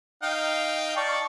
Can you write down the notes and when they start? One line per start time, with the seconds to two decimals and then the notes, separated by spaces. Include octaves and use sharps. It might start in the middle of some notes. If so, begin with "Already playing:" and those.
0.23 D#4 F5 G5
0.97 D5 A5 C#6